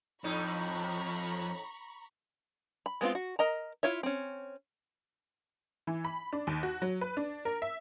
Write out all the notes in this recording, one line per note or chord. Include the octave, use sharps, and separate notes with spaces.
F2 A2 D#4 A#5 B5 C#6
B5
G#3 B3 C4 F4
F#4
A#4 D#5 A#5
E4 F4 C#5 E5
C4 C#4
E3
B5
D4
D#2
F#4
F#3
B4
D4
A#4
E5